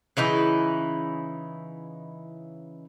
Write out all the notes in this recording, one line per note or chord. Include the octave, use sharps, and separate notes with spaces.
C#3 E3 D#4 E4